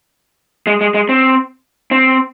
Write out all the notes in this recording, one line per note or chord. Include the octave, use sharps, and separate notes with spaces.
G#3
G#3
G#3
C4
C4